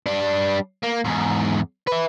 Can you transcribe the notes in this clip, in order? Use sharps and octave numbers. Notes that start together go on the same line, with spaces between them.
G3 D4
A#3
E2 G#2
B4 E5